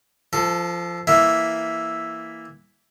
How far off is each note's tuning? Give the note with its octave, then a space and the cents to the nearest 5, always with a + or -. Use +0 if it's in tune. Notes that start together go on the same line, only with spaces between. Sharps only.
F3 -15 A4 +15
E3 +0 A#3 +0 E5 +0